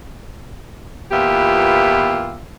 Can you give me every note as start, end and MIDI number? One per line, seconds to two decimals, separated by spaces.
1.11 2.39 40
1.11 2.39 46
1.11 2.39 59
1.11 2.39 65
1.11 2.39 67
1.11 2.39 76